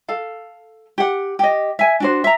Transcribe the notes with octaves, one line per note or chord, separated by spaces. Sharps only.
A4 F5
G4 F#5
G4 D#5
E5 G#5
D4 F#4 C5
E5 A#5